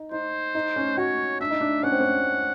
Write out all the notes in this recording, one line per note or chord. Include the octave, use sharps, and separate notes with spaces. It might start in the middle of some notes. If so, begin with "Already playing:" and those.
Already playing: D#4
D#4 C5
D#4
C#4
F#4 C#5
D4 E5
D#4
D4
C#4 F#5
C4
C#4